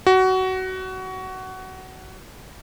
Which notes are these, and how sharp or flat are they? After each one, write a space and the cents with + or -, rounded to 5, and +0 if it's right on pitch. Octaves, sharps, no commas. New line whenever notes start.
F#4 +20